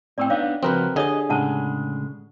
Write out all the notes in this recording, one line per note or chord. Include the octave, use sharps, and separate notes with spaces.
A2 C4 D5 G5
B3 D4 D#4 C#5 F5
C#2 F3 C4 F#4 A#4 B4
D3 G4 G#4 C#5 D#5 D#6
A2 C#3 G#3 D4 F#5 A5